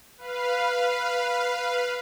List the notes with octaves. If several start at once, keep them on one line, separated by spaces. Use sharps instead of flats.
B4 F5